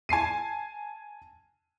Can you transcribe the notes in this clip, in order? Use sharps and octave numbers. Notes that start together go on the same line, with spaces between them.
G#5 A5 C7 D#7